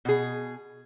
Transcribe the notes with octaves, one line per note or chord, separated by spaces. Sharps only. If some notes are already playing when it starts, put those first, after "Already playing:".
B2 G#4